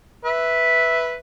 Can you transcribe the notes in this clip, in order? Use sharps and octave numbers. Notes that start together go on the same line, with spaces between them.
B4 E5